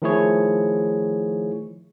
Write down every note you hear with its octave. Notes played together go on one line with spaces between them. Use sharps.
D#3 F3 A3 E4 G#4 C#5